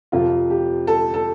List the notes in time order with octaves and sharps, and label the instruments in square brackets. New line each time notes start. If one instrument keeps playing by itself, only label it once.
[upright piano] F2 C3 F3 F4
G4
A4
A4